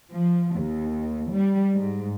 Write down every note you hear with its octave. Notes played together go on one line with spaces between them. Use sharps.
F3
D#2
G3
G#2